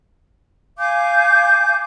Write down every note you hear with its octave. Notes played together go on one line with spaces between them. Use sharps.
F5 G#5 D6 G6